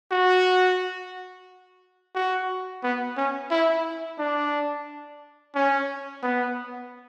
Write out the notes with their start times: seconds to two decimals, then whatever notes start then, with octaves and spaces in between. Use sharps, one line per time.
0.11 F#4
2.15 F#4
2.83 B3
3.17 C#4
3.51 E4
4.19 D4
5.55 C#4
6.23 B3